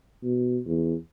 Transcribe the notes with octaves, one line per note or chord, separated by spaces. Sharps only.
B2
E2